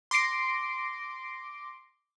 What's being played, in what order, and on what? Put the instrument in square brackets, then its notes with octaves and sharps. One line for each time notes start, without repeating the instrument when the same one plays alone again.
[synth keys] C6 D6 A#6 C7 D7